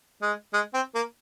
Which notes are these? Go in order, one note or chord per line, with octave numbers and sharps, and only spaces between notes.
G#3
G#3
C4
A#3